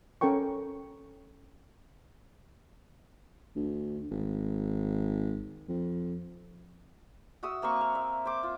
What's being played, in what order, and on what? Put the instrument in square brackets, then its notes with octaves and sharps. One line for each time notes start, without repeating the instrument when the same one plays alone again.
[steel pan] C#4 A4 A#4 G5 C#6
[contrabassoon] D2
G#1
F2
[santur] F#4 E5 D#6 E6
A#3 C4 A#4 C#6
F5
E5
C5 D6
F4